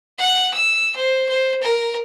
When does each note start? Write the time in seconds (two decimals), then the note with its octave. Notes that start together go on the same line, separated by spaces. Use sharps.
0.18 F#5
0.54 E6
0.96 C5
1.29 C5
1.62 A#4